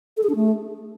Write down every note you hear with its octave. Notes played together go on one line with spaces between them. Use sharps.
A4
G#4
D4
A3